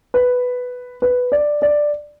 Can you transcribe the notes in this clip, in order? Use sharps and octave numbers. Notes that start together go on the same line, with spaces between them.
B4
B4
D5
D5